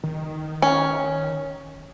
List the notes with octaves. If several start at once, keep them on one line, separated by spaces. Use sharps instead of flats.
D#3
C#4